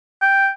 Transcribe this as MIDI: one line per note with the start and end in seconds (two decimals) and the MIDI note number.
0.22 0.49 79